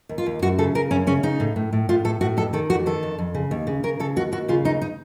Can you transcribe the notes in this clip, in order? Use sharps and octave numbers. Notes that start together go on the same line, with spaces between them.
D#2
F4
D#2
F#2 F#4
C#3 A4
C#3 A#4
F#2 C#4
C#3 C#4
C#3 D#4
A2
A2
A2
A2 F4
A2 A4
A2 F#4
F2 A4
D#3 A4
F2 F#4
D#3 A4
F2
F2
C#3
D#2
C#3
C#3 A#4
C#3 A4
D#2 F#4
D#2 F#4
C#3 F4
D#2 D#4
D#4